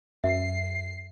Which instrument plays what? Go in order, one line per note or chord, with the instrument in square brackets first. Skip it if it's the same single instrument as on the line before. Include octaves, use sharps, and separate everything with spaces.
[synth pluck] F#2 [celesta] E5 [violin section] C7